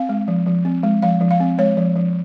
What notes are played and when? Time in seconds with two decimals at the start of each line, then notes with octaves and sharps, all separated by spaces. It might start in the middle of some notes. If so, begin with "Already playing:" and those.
Already playing: C4 F5
0.09 G#3
0.28 F3
0.47 F3
0.65 C4
0.83 G#3
1.02 F3 F5
1.21 F3
1.31 F5
1.40 C4
1.58 G#3 C#5
1.77 F3
1.95 F3